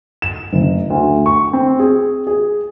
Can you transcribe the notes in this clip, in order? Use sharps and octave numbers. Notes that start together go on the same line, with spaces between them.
E7
F#1
D2
C#6
C4
G#4
G#4